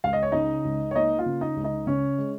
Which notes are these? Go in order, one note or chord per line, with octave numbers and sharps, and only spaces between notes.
C#2 F5
D#5
C#5
C#3 D#4 D#5
C#2
C#5
A#3 D#4 D#5
F4 F5
C#3
D#4 D#5
C#2
D#4 D#5
C#3 C#4 C#5
G#3